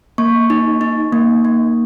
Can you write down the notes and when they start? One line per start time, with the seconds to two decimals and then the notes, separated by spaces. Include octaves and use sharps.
0.18 A#3 C#6
0.50 D#4
0.81 D#4
1.13 A#3
1.45 A#3